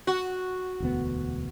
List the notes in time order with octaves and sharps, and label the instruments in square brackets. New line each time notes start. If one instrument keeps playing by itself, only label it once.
[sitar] F#4
[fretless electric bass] E1 D2 B3